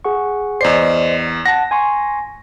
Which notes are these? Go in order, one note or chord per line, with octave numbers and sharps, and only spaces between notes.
G#4 F#5 C#6
E2 C5 D5 D#5 C7
F#5 A5 A#6
G#5 C6 C#6